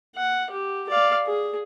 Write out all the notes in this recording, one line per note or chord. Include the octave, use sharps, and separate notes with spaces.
F#5
G4
D5 F5
G#4